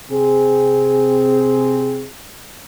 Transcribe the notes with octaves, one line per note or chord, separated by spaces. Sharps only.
C3 C4 G#4